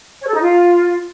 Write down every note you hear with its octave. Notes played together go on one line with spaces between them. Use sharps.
C#5
A4
D#4
F4